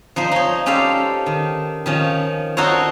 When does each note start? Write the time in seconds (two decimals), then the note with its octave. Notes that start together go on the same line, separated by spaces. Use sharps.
0.16 F3 D#4 C5
0.32 D#4 C#5
0.66 C#4 G4 A4 C5 F5
1.26 D#3
1.86 D#3 F3 C#4
2.57 D#4 F#4 A4 A#4 C5 C#5